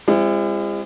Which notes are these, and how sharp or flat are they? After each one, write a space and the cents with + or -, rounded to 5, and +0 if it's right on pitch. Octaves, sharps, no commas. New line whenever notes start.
G#3 -45 C4 +0 E4 +40